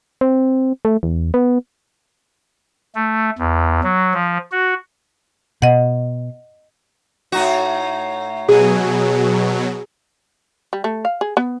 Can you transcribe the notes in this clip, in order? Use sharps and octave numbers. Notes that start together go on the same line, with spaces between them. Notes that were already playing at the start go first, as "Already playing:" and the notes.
C4
A3
E2
B3
A3
E2
F#3
F3
F#4
B2 D#5 F#5
A2 D#4 F#4
B2 F#3 G#4
G3
A3
F5
G#4
B3